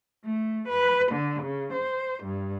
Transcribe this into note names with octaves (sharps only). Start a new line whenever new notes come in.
A3
B4
D3
C#3
C5
G2